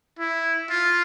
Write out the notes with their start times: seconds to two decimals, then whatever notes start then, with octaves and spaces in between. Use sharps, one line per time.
0.19 E4
0.70 F4